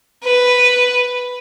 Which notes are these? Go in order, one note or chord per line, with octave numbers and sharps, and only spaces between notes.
B4